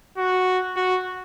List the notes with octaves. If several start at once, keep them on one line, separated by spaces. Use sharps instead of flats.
F#4
F#4